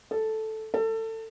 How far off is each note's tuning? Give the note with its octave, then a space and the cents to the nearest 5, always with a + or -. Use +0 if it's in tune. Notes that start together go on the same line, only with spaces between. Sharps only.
A4 -5
A4 +25